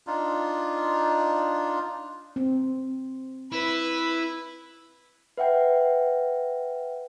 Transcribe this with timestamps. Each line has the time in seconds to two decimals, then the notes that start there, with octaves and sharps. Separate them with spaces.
0.07 D4 D#4 F4
2.36 C4
3.52 E4 B4
5.37 B4 E5 F#5 G5